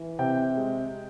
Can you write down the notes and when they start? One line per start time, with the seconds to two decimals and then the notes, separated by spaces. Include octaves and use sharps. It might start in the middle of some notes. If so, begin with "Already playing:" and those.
Already playing: E3
0.19 C3 G5
0.57 G#3